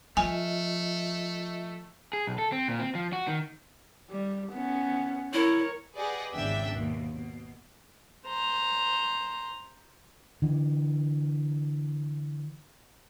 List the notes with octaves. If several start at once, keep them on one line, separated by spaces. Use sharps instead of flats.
F3 A3 F4 D#5 E5 G#5
G#4
B1
A4
C4
A#2
C4
F3
F#4
D#3
G3
B3 C#4
E4 A#4 C#5
G4 G#4 B4 D5 D#5 F#5
G#1 E2 C#3 D4 E5 G5
D#2 B2
B2
C5 A#5
D3 E3